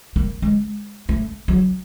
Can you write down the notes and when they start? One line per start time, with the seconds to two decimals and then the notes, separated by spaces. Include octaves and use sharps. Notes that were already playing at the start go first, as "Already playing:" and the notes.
0.16 A#3
0.42 G#3
1.09 A3
1.48 F#3